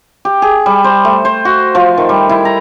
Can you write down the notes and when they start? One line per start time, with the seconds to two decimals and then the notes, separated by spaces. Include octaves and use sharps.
0.25 G4
0.42 G#4
0.66 G3
0.84 C5
1.05 A3
1.25 C5
1.45 F#4
1.75 F3
1.98 D#3
2.09 G3
2.29 E4
2.45 A#5